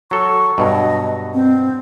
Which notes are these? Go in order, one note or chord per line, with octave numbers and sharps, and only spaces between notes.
F#3 A4 C#6
G2 B2 F#3 D#5
C4